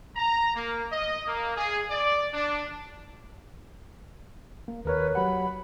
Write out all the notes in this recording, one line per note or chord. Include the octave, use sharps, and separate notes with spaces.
A#5
A#3
D#5
A#3
G#4
D5
D4
A#3
D#2 A#4 B4 C#5
F#3 G4 F#5 B5